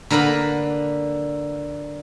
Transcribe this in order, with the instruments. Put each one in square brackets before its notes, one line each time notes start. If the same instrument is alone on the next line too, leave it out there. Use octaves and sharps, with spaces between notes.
[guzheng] D3 A#3 A#4 B4 B5